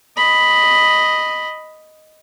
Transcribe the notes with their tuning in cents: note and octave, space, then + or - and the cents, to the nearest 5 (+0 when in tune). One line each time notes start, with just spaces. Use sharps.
D#5 +0 B5 +0